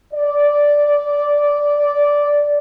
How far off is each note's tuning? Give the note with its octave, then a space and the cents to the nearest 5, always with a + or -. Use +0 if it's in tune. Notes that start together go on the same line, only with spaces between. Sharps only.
D5 -10